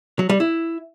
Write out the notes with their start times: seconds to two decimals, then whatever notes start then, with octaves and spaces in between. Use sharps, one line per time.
0.19 F#3
0.29 G3
0.40 E4